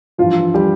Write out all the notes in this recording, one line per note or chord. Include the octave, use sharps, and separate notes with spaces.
G2 E3 F3 F4
G3 G4